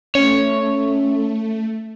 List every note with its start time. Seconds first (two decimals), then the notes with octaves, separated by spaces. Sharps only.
0.15 A3 C#4 C#5